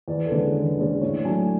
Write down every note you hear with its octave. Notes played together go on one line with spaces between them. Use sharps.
E2 D5
A4
D3 G#3 C#4 B4
E2
D3 G#3 C#4 D5
A2 C#5
F#3 A3 D4 G#5